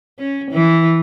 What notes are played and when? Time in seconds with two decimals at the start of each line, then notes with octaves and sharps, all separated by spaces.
0.19 C#4
0.51 E3